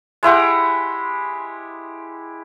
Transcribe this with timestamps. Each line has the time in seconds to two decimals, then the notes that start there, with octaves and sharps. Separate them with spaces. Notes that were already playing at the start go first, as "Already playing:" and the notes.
0.23 G#3 E4 G4 F#5